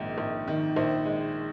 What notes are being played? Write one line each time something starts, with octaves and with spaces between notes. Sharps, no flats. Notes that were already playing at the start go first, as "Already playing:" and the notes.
Already playing: A#1 G#2 D#3
A#1
D#3
A#1 C5
G#3